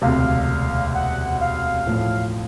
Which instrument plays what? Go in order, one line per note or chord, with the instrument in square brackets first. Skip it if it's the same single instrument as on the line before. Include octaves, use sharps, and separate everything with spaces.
[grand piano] E1 D2 C3 [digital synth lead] F5
[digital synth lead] F#5
F5
[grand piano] A1 A2 F3